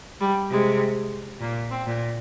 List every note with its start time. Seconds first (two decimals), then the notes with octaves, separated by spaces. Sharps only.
0.20 G3
0.51 C3 G#3
1.41 A#2 A#3
1.71 C4
1.86 A#2